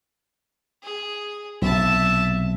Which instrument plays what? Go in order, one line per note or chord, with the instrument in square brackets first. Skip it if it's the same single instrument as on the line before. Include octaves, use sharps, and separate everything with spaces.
[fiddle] G#4
[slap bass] B1 C3 [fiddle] E5 A5